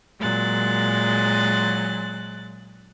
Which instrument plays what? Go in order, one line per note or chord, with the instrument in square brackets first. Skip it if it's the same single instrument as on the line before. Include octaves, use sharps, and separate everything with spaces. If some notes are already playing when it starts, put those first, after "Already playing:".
[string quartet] A#2 F#3 G#3 F#6 A6